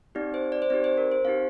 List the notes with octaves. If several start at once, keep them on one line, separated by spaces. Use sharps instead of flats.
C4 D#4 G4 D5
C5
D5
C5
C4 D#4 G4 D5
C5
A#4
C5
C4 D#4 G4 F5